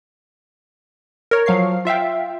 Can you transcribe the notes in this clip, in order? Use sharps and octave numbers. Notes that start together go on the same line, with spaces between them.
A#4 C#5
F3 F#3 F5 C#6 C7
F4 E5 F5 G5